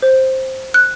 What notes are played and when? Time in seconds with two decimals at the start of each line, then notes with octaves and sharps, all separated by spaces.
0.02 C5
0.74 F#6